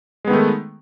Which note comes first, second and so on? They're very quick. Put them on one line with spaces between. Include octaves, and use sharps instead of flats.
G#3 B3 D#3 A3